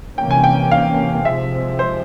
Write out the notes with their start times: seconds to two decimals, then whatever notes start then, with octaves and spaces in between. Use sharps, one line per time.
0.18 C3 E3 A#3 C#4 G5
0.31 G#5
0.44 G5
0.71 F5
1.25 C3 F3 G#3 C4 E5
1.79 C5